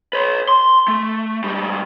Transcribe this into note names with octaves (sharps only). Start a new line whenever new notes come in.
B4 C#5
C6
A3
G#2 G3